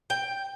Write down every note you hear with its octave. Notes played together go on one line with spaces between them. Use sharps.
G5